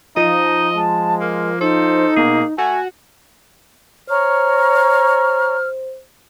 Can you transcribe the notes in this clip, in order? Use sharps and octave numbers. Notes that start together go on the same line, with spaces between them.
F3 D#4 D#5
G#3 A5
A#3 A#4
D#4 A4 C5
B2 A#3 G#4
A3 F#4 G#5
C5 C#5 A#5 C#6 F6